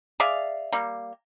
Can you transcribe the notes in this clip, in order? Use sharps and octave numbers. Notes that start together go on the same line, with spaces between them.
G#4 D5 E5 F5
G3 A#3